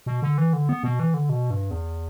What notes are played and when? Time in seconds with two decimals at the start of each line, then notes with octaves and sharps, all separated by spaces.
0.06 B2
0.22 D3
0.38 E3
0.53 D3
0.69 B3
0.83 B2
1.00 E3
1.14 D3
1.29 B2
1.50 G2
1.71 E2